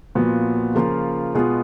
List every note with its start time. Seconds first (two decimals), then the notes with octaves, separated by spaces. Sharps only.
0.15 A#2 F3 B3 F#4
0.75 C#3 F3 A#3 F4
1.34 B2 G#3 B3 F4 G#4